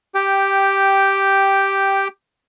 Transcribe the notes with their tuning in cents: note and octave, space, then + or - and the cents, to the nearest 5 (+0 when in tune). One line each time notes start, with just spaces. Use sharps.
G4 +0 G5 -5